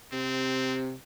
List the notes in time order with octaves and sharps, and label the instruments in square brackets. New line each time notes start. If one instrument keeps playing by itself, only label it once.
[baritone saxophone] C3 [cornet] C4